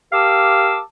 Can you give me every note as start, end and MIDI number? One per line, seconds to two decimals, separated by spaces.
0.13 0.80 67
0.13 0.80 70
0.13 0.80 77
0.13 0.80 81
0.13 0.80 86
0.13 0.80 88